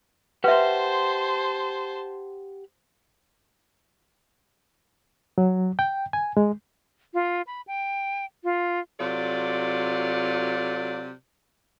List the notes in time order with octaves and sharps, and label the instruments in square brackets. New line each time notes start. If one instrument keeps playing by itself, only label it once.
[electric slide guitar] G4 F#5 [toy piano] B4 E5 [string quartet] C5 A5 C6
[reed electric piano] F#3
G5
G#5
G#3
[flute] F4
B5
G5
F4
[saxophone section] C3 F#3 F4 A4 D5